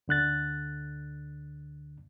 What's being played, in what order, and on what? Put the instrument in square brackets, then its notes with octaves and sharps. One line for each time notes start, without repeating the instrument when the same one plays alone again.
[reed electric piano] D2 D3 F#6 A6